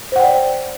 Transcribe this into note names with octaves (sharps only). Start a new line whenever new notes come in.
C5 D5 F#5 G5